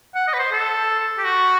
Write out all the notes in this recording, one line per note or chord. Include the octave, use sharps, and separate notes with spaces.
F#5
D#5
B4
C5
A4
G4
F#4